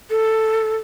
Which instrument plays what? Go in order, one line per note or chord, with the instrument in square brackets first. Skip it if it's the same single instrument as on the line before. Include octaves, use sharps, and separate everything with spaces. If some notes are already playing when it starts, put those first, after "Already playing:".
[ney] A4